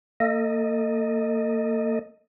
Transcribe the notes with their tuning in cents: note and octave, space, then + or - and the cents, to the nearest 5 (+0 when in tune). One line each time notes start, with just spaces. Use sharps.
A#3 -30 A4 +30 D#5 +0